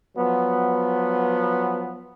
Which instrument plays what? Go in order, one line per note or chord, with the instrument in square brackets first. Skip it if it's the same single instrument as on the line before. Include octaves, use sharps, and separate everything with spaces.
[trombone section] F3 F#3 B3